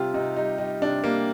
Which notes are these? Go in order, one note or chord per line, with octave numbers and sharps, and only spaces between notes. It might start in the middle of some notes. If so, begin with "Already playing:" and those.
Already playing: C3 G3 F4 G4
C3 D#4
G3 D#4
G3 D#4
C3 D4
G3 A#3